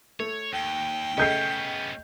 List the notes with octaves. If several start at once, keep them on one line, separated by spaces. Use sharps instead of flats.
A3 C#5
D#2 G5
C#3 A3 B3 C#4 D#5 G6 C7